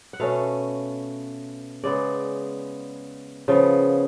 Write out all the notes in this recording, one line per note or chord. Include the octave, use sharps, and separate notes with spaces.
F#5
B2 A3 C#4 F5
C#3 G#3 B3 D5
C#3 F3 B3